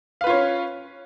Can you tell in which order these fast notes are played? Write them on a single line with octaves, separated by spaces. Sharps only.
F5 B4 F4 C#5 C#4